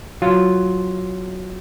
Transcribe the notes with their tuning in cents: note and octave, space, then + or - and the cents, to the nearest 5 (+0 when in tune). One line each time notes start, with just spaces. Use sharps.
F#3 +0 F4 +0